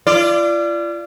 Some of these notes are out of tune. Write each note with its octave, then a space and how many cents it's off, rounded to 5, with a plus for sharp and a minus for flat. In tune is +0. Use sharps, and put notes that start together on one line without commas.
F4 -40 D5 +0